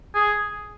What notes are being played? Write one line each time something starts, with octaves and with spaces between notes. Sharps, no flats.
G#4